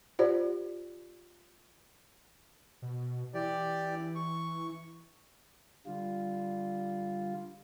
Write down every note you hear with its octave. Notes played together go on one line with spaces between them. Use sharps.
F4 G4 C5 D5
B2
E3 G4 D5
C#6
D3 G3 F4